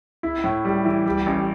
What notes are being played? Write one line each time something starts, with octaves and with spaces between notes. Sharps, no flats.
E4
A2
G3
E3
G3
A1